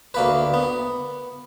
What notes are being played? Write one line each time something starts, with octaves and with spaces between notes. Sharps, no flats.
D2 A#3 B4
B3